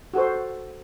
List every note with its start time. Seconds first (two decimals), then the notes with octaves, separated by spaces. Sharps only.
0.14 F#4 A4 C5